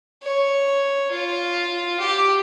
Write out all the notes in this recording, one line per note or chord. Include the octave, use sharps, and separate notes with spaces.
C#5
F4
G4